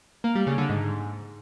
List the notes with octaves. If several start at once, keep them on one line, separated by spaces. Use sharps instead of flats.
A#3
G3
C#3
D3
G#2